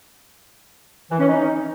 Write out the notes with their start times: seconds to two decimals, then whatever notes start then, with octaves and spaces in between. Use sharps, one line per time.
1.11 E3
1.19 C#4
1.27 D#4